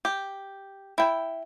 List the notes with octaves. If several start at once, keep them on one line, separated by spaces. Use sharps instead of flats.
G4
E4 G5